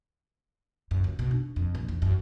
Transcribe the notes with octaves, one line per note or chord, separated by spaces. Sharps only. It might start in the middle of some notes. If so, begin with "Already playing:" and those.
F#2
C#2
B2
D4
F2
A#1
E2
F#2